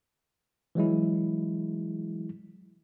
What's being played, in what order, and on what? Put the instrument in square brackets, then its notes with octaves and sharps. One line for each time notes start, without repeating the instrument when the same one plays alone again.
[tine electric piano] E3 F#3 G#3 E4